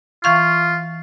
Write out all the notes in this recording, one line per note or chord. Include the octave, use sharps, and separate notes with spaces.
E3 F4 F5 C#6